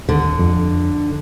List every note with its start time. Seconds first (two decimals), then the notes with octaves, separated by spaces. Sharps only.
0.09 D#2 D3
0.39 F2